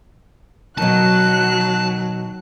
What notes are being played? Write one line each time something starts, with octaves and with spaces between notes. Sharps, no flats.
B2 D#3 F#3 A5 F#6